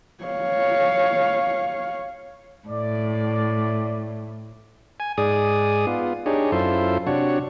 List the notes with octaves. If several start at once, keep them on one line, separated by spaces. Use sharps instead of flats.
C#5 F5
A2 D5
G#5
G#2 G#4 D5 D#6
B3 F4
D4 D#4 G4 G#4 C#5
F#2 E4 F4 A4 C5
C3 D4 F#4 C#5